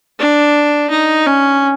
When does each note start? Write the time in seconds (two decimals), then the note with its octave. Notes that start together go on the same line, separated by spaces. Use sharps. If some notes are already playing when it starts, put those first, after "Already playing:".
0.19 D4
0.90 D#4
1.26 C#4